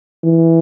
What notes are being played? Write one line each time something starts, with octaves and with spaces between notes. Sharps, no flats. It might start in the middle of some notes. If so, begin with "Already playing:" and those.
E3